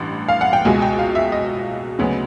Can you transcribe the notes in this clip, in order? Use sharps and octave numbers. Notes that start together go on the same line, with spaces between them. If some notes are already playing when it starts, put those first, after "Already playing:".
Already playing: A1 G2
F5
F#5
G5
C#2 B2 G#3 G#5
G5
F5
E5
D#5
D2 C#3 F#3 B3